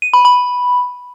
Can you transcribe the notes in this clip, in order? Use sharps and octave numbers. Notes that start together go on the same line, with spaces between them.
D#7
B5
B5